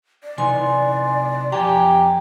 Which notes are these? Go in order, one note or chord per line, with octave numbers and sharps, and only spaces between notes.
D5
C3 E3 D#4 G#5 C6
F2 G4 G5 G#5 A#5